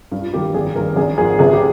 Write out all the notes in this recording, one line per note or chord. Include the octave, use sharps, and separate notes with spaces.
G2
F4
D#3 G3 A#3 G4
G#1 G#4
G2 D#3 A#4
G#1 G#4
G#2 F3 A#3 G#4
G1 G#4
G4